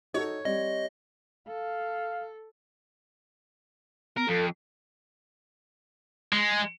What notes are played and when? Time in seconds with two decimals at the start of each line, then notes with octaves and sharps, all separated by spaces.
0.14 D#4 F#4 A4 C#5
0.45 G3 C4 D#5
1.48 A4 F5
4.17 B3 A#4
4.28 F2 A4
6.33 G#3